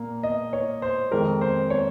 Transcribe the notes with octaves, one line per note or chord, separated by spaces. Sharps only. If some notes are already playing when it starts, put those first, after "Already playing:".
Already playing: A#2 A#3
D#5
C#5
C5
F2 D#3 G#3 C4 A#4
C5
C#5